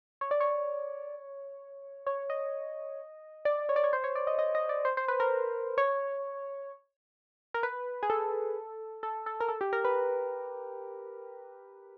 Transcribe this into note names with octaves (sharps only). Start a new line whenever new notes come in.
C#5
D5
C#5
C#5
D#5
D5
C#5
D5
C#5
C5
C#5
D5
D#5
D#5
D#5
D5
C5
C5
B4
A#4
C#5
A#4
B4
G#4
A4
A4
A4
A#4
A4
G4
A#4
B4